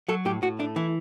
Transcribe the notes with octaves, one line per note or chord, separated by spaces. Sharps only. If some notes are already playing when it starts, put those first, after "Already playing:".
F#3 A4
A2 G4
A2 F#4
A3 D4
E3 E4